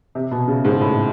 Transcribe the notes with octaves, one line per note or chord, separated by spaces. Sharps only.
C3
B2
C#3
G#2
A2